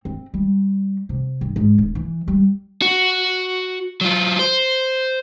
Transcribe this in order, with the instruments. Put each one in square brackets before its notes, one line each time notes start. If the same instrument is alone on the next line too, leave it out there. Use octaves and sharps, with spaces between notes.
[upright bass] C4
G3
C3
G2
G#2
D1
E3
G3
[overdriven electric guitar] F#4
F#3 F4
C5